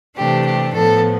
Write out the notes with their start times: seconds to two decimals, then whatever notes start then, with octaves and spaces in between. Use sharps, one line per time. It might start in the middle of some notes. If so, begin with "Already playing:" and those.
0.17 C3 E3 A3 D4 G4
0.46 G4
0.73 A2 F3 B3 A4